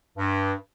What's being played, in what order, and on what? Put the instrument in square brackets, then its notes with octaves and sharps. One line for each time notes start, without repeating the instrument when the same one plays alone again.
[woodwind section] G2